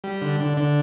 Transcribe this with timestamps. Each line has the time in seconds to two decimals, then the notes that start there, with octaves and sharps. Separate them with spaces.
0.04 G3
0.22 D3
0.40 D3
0.57 D3